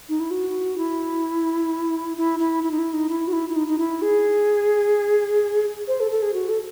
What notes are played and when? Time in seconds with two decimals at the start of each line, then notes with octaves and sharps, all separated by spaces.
0.09 D#4
0.20 E4
0.31 F#4
0.78 E4
2.17 E4
2.39 E4
2.63 E4
2.71 D#4
2.79 E4
2.93 D#4
3.09 E4
3.28 F#4
3.33 E4
3.49 E4
3.56 D#4
3.67 D#4
3.78 E4
4.02 G#4
5.88 C5
6.00 A4
6.11 A4
6.22 G#4
6.34 F#4
6.49 A4